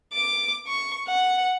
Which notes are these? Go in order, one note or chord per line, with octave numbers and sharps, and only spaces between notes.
D6
C#6
F#5